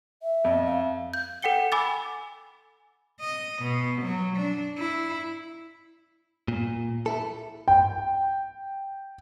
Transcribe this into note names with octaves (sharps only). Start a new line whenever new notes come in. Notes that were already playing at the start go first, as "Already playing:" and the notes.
E5
F2
F5
G6
A4 F#5 G5 C#7 G7
G#5 B5 D6 E6 A6
D#5
B2
F#3
D4
E4
A#2
E4 A4
G5